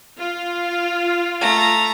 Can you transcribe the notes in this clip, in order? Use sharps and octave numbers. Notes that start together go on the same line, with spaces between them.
F4
A3 A#5